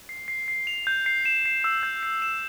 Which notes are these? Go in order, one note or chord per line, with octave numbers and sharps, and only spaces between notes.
C7
C7
C7
F7
G6
C7
E7
C7
E6
G6
C7
E7